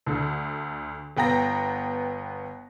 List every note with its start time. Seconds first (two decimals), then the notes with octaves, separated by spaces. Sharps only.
0.06 D2 D3
1.17 G1 B3 G5 A#5 A#6